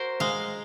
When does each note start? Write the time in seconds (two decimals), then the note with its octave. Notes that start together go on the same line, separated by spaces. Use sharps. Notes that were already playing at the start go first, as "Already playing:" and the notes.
Already playing: F#4 A#4 C5
0.20 G#3 F5